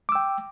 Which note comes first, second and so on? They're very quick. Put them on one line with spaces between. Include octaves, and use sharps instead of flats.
D6 E6 G5